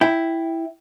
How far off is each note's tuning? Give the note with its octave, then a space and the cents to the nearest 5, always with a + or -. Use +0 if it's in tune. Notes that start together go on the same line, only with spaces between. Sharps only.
E4 +0 G5 +0